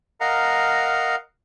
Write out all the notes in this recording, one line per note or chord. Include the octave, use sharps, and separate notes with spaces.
A#4 D#5 F5 F#5 A#5